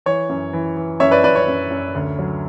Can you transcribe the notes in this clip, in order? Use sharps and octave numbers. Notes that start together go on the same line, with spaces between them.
E3 C#5
F#2
E3
E3
F#2 C#5 E5
B4 D5
F#2 B4 D5
C#5
F#2
F#2
D2
F#3